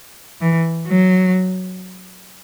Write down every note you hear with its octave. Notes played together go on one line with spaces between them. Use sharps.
E3
F#3